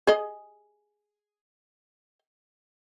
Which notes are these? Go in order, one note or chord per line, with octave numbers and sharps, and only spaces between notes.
G#4 D#5